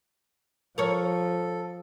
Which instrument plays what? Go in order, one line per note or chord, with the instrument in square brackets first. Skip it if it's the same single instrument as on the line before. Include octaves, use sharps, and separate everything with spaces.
[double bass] F3 [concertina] A4 [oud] A#4 C#5